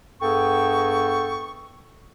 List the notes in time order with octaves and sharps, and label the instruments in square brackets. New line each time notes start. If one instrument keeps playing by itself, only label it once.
[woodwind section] G2 B3 G#4 A4 G5 C#6